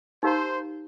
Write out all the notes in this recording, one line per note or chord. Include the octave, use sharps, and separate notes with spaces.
D#4 G4 A#4 C5 F5 A#5